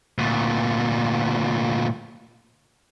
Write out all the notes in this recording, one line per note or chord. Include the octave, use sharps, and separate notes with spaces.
D2 A#2